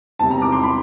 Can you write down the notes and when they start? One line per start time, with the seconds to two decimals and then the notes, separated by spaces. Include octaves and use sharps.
0.19 E1 E2 C3 A5
0.31 A#5
0.42 D6
0.52 C6
0.63 B5